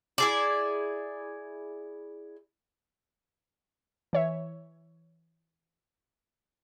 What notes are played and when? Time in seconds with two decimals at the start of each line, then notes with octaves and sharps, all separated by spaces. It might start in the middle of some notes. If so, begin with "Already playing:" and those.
0.18 E4 G#4 D5
4.13 E3 C#5 E5